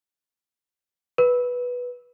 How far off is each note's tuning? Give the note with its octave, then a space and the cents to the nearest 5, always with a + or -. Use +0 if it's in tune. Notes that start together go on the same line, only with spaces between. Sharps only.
B4 -5